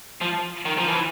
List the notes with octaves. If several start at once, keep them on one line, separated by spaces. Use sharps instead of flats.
F3
D#3
F3
E3